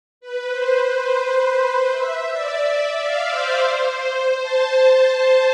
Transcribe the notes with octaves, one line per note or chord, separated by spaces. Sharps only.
B4
C5
B4
C5
E5
D5
E5
F5
C5
C5
A5